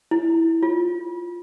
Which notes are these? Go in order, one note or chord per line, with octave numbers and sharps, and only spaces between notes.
E4
F4